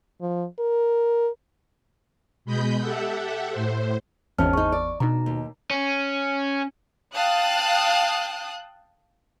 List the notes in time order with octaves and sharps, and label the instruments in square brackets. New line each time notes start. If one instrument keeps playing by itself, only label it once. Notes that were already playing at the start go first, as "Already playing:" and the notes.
[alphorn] F3
A#4
[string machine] B2 G#3 D#5 B5 G6
G4 A4 E5 F#5
A2 C5
[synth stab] G#1 E2 [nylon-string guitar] D#3 C#4 [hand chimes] C5 A5 F6
[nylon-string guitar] D#4 G#4 [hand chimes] C#6
[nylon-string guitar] D5
[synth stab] B2 [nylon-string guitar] D4 [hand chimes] D#4 A#5
[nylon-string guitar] D#2
[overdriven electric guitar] C#4
[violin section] F5 G5 A5 D#6 F#6